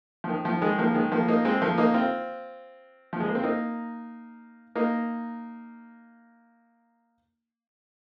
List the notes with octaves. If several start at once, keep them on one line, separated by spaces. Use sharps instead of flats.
F3
D#3
F3
D#3 G#3
F3 A#3
D#3 G#3
F3 A#3
A#3 D#4
G#3 C4
F3 A#3
A#3 D#4
C4 F4
F3
G#3
A#3
C4
A#3 D#4
A#3 D#4